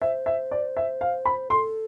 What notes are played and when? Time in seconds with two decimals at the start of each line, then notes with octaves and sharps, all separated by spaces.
0.02 C5 E5
0.26 E5
0.51 D5
0.77 E5
1.01 F5
1.25 B5
1.50 A4 C6